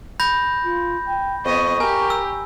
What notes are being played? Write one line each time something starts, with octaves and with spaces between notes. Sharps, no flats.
B5 G6 A#6
F4
G5
F2 B3 D#5 C#6
G4 A#4 G#5
E6